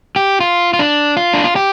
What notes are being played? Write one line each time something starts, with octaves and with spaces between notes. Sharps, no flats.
G4
F4
F4
D4
F4
D4
F4
G4